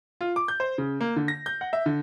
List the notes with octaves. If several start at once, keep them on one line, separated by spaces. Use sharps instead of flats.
F4
D6
G6
C5
C#3
A#3
D3
A#6
G6
F#5
E5
D3